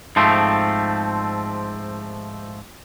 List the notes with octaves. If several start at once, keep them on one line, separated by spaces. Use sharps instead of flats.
G#2 F3 A3 C4